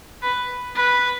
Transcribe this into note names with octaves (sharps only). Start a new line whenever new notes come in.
B4
B4